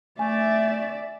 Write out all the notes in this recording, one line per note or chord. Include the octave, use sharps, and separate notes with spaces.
A3 D5 E5 G#5